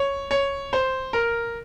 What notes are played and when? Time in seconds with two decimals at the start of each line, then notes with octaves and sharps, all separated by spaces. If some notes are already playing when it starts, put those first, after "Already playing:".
Already playing: C#5
0.31 C#5
0.73 C5
1.13 A#4